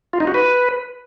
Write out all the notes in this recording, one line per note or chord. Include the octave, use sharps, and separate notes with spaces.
F4
D#4
F#4
B4